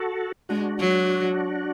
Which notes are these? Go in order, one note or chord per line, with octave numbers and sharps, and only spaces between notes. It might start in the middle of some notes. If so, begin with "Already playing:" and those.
Already playing: F#4 A4
G#3 D4 F#4
F#3